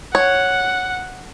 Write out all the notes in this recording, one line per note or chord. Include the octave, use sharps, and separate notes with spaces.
C#5 F#5